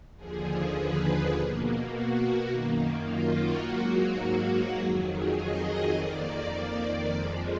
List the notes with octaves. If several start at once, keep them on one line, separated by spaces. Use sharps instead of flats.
D#2 D3 F3 G#4
B4
B2 A#3
F#4
F#2 D#3 A#3
F4
F#4
G#2 F#3 A#3
F2 D#3 F#3 G#4
G#4
D#5
F2 D#3 A#3 D5
F2 F3 G#3 D5